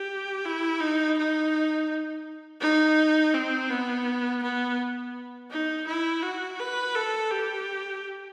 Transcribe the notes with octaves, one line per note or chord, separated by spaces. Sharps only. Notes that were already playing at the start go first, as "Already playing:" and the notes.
Already playing: G4
E4
D#4
D#4
D#4
C4
B3
B3
D#4
E4
F#4
B4
A4
G4